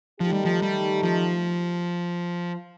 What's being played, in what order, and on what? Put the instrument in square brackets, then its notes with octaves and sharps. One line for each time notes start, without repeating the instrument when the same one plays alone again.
[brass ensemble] D#3 A3 D#4 G4 [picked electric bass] F3
[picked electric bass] G3
F3
G3
F3